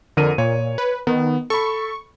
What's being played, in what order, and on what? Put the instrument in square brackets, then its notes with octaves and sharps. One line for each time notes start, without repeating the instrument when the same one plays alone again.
[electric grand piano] F2 A#4 D#7 [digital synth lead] D3
[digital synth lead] A#2 [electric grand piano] C#5
[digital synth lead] B4
[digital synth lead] D#3 [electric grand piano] B3
[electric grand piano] A4 B5 [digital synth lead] C#6